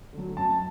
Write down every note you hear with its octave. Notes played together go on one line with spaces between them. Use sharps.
D3 F#3
F#2 A5